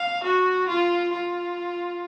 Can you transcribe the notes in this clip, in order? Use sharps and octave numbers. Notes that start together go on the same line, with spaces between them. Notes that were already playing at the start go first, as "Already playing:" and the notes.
Already playing: F5
F#4
F4
F4